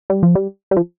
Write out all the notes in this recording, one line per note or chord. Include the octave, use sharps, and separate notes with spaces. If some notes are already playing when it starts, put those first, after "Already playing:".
G3
F3
G3
G3
F3